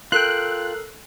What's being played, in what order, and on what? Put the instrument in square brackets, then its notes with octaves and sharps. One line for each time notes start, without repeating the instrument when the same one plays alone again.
[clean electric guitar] F4 G5 [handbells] A4 A#4 C7 [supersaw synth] F#6